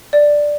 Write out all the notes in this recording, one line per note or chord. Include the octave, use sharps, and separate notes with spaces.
D5